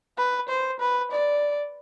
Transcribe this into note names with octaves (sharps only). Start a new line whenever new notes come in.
B4
C5
B4
D5